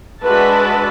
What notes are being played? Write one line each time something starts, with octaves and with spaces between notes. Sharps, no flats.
G#3 D4 F#4 B4 E5 A5